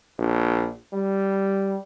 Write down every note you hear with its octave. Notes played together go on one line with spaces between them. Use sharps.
A#1
G3